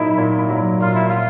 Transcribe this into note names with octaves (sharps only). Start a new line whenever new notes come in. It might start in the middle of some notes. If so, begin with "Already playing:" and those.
Already playing: A#2 F#3 A#3 D#4 E4
A#2
F#3
A#2 F4
E4
F#3 F4